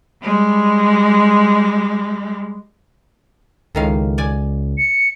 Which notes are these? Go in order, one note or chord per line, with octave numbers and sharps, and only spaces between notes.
G3 G#3
C#2 A2 D#3 F5
D5 G#5
C#7